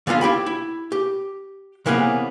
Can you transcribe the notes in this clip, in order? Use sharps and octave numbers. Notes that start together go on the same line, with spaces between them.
D3 G#3 B3 F4 C5
E4 G4 G5 B5
E4
G4
C3 E3 A#3 B3 C#4 G#4